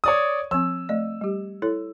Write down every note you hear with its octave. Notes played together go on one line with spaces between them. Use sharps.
C#5 D5 D#6
F3 C4 E6
A3 D5 D#5
G3 G4
E4 A4 C#5